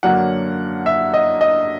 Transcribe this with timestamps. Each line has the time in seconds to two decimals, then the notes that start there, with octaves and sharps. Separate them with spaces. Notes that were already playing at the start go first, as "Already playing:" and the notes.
0.03 F#2 D3 F#3 A#3 D4 F#5
0.86 E5
1.14 D#5
1.41 D#5